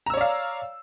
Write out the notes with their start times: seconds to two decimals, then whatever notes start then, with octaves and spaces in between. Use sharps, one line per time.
0.06 A#5
0.10 E6
0.14 C#5
0.17 D5
0.21 F5